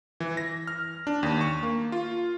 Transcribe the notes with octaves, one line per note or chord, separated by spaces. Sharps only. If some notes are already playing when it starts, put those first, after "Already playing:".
E3
A#6
F6
D4
D#2
C#6
A#3
F4